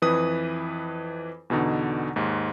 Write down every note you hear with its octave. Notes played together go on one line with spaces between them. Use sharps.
F2 E3 B4 D#6
E2 B2 D3 D#4
D#2 G#2